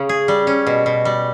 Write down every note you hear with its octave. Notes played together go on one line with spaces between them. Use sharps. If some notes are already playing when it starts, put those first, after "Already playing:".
Already playing: C#3 C#4
G#4
G3
C#4
B2
B2
G3